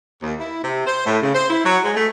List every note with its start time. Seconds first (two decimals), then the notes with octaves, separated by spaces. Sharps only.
0.23 D#2
0.39 E4
0.64 C3
0.87 C5
1.06 A2
1.22 C#3
1.34 C5
1.50 E4
1.65 F#3
1.84 G#3
1.95 A3